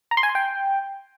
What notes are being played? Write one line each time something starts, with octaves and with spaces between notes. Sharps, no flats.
A#5
C6
G#5
C6
G5